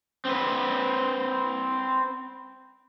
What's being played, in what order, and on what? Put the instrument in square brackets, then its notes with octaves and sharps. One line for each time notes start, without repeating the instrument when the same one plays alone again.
[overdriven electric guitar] C4 B4